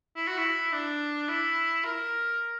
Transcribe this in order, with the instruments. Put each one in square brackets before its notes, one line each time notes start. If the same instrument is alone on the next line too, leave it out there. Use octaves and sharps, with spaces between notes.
[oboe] E4
F#4
E4
D4
E4
A#4